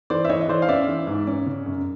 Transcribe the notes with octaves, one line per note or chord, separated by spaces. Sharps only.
E3 C5 D5
E5
E3 C#5 D#5
D#5
E3 C5 D5
F5
C#4 D5 E5
E3
G#2
C#4
C#3
F#2